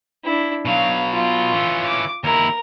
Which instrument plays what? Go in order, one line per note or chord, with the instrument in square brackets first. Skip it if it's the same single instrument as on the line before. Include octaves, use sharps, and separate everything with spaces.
[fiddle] D4 E4
[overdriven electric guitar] B2 F#3 [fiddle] F5
[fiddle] F4
[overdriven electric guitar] E3 C#4
[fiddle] D6
[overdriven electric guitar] D#2 E4 [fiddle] A#4